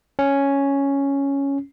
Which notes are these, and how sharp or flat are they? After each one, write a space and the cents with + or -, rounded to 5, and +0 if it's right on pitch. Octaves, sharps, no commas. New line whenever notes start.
C#4 +0